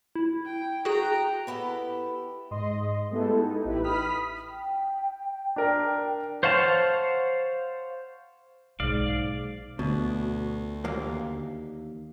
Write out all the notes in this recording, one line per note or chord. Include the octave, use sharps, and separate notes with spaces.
E4
G5
F#4 G#4 G5 A#5 F#6
B3 E4 G4 A4
G#2 D#5 C6
G#3 A3 B3 E4 G4 A4
D#4
A1 E4 G4 B4
B5 D#6 F6 B6
G5
D4 A#4
C5 C#5 F5 F#5 A5
B1 G#2 A#3 D5 F5
D2 B2
D#2 A#3